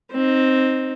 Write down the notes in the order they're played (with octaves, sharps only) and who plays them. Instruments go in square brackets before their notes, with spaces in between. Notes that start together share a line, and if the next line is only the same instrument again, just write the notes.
[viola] C4 D#4